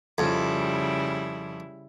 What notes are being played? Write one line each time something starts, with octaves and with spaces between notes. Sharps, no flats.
F2 C#3 G3 E4